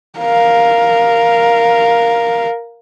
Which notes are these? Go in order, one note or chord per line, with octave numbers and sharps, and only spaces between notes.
A#4 F5